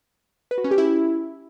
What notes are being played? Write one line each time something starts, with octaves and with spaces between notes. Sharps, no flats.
B4
F#4
C#4
G4
E4